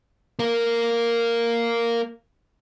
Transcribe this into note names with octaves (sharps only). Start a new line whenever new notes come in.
A#3 A#4